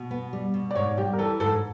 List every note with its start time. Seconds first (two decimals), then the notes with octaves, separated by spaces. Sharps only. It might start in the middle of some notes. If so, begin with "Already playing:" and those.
Already playing: B2
0.11 B3
0.33 G3
0.54 B2
0.71 D5
0.75 G#2 C#5
0.97 G3 G4
1.13 A#4
1.19 E3 A4
1.40 G#2 A4